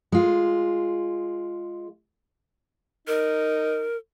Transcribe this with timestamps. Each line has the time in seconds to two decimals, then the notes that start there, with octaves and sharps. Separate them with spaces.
0.12 G#3 F4
3.07 D#4 A#4